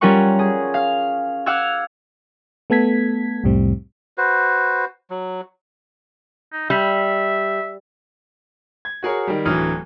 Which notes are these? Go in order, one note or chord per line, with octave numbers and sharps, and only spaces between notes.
G3 C#4 F4 A#4 F#5 C#6
G#4
F5
F5 F#5 D6 E6 F6 G#6
A3 B3 A4 G#6 B6
C2 F2 A2 G3 C4
F#4 B4 C5
F#3
D#4
G3 E5
G#6
F#4 G#4 A#4 C#5
D#3 G3
D1 D3 E3 F#3 D#6 F6